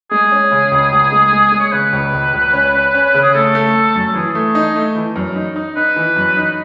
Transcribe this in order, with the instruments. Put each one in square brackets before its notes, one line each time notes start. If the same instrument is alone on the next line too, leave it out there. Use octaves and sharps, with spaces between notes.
[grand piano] G#3 [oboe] G#4
[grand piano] C#4
C#3
C#2
C#2
G#3
G#3
G#3
[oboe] C#5
[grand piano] C#3 [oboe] B4
[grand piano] C#2
C#2
C#2
C#4
C#4
C#4
C#3
[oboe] G#4
[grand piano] A3 [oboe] A4
[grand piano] A3
A3
F#2
[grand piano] E3 [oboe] G#4
[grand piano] A3
D#4
A3
E3
F#2
D#4
D#4
[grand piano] D#4 [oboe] B4
[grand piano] E3
F#2
D#4